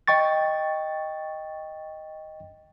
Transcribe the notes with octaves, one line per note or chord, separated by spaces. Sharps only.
D#5 G5 C#6 A6